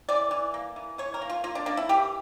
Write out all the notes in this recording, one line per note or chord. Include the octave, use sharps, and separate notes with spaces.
E3 D5
E3
A#3
E3
E3 C#5
A#4
A#3
F4
A#3 F4
D4
A#3 D4
E4
E3 G4